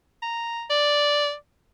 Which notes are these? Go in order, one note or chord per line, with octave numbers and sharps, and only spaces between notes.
A#5
D5